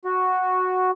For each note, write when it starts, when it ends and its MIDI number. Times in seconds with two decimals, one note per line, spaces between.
0.05 0.91 66